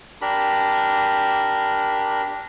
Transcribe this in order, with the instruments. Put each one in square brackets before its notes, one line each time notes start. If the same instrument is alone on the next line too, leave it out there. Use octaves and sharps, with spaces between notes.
[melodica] D4 G4 A#4 B5